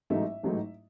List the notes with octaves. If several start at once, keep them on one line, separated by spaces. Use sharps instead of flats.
A1 G#2 F#3 A3 D#4 E5
A1 G#2 F#3 A3 D#4